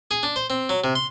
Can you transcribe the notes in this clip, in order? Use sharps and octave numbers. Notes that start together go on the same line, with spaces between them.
G#4
D4
C5
C4
F#3
C3
C6